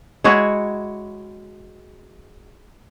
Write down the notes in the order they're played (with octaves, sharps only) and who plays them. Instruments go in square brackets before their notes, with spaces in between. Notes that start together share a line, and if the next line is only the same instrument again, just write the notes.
[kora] G#3 E4 F#4 C#5